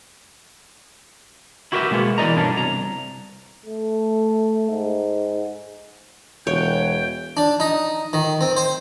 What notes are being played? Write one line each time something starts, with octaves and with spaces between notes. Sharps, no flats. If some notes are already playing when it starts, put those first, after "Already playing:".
E4 F#4 G4 A#4 B4 E5
B2 G#3 A#3 B3
B2 E3 A#4 D5 D#5 A#5
G2 B2 C#4 D4 A4
C2 A#5
A3
G#2
E1 C#5 G5
D4
D#4
D#3
C4
C5